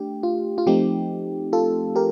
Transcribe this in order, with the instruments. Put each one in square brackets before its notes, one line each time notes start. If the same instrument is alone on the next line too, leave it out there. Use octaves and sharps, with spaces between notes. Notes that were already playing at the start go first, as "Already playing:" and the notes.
Already playing: [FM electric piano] A3 D4 G4
F4
F4
F3 A3 C4 D#4 G4
F4 A4
G4 A#4